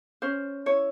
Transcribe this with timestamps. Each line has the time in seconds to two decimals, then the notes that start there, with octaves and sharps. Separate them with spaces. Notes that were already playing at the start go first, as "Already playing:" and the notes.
0.22 C#4 C5
0.66 E4 C#5